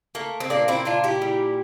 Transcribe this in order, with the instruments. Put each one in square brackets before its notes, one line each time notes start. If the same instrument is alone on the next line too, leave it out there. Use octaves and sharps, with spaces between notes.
[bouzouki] A3 A#3
C4
A#2 A#3 D4
C4 E4
A#2 D4 F4
E4 G4
G3